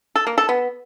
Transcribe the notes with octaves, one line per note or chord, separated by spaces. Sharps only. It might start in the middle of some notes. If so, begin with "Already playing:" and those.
A4
A#3
A4
B3